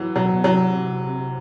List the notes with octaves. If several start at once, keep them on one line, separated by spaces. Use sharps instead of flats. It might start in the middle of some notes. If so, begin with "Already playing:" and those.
Already playing: E3 F#3
B2 F#3
B2
C3 F#3